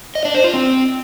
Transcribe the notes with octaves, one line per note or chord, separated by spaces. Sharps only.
D#5
D4
C5
F4
C4